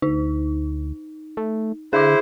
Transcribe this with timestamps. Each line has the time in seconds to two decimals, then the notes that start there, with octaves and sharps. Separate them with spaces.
0.02 D2 D#4
1.37 A3
1.93 D3 E4 G#4 C5 D6